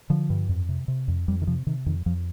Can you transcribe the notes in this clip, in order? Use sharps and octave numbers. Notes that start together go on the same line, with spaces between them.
D3 F3
G2
F2
C3
C3
F2
F2 G3
D#3
C3 F3
C3 D#3
F2 D#3
F2 F3